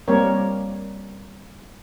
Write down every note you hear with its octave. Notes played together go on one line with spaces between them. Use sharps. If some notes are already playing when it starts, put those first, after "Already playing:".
G3 A#3 C4 A#4 C#5